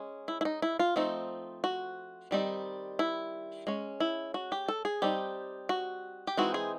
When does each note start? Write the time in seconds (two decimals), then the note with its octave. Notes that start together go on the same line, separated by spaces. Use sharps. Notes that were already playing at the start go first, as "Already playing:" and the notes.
Already playing: G#3 C#4
0.28 E4
0.41 E4
0.45 D#4
0.62 E4
0.79 F4
0.96 F3 A3 C4 D#4
1.64 F#4
2.31 D#3 G3 C4 D#4
2.99 E4
3.67 G#3 C#4
4.00 E4
4.34 F#4
4.52 G4
4.68 A4
4.85 G#4
5.02 G3 C4 D#4 G4
5.69 F#4
6.27 G4
6.37 E3 G#3 C4 D#4 F#4
6.54 G#4